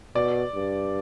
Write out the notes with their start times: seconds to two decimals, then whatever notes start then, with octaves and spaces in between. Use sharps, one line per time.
0.15 B2 D5
0.55 G2